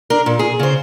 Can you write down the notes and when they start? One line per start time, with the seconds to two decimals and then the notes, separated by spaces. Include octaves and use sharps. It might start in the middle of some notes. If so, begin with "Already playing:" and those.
0.10 D4 A#4
0.26 A#2
0.39 G#4
0.59 C#3 C5